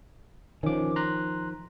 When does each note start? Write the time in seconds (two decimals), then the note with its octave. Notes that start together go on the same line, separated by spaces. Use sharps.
0.63 D#3 F3 C#4 D6
0.96 A#5 C6 F#6